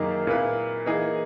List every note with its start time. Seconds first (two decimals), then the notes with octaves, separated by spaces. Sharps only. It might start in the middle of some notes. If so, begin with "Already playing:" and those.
Already playing: F#2 D#3 A#3 D#4 G#4
0.27 A#2 A#3 E4 B4
0.86 E3 A#3 D#4 G#4